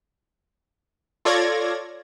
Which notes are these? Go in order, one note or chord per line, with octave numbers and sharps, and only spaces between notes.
F4 A4 C#5 D5 G#6 A#6